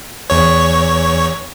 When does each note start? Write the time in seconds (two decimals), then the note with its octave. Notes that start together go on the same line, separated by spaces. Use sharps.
0.30 E2 C#5